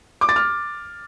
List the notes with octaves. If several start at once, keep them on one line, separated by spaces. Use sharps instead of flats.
D6
A6
F6